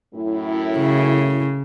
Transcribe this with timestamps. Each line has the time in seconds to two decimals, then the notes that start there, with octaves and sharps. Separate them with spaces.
0.13 F#2 A2 E4
0.78 C#3